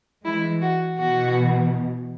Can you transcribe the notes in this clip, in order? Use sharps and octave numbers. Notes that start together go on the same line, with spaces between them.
E3 G#3 E4
F#4
B2 E3 F#4